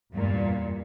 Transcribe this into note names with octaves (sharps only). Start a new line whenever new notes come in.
E2 G2 A#2